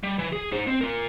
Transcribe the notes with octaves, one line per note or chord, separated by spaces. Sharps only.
G3
E3
G#4
D#4 C5
C4
F4 A#4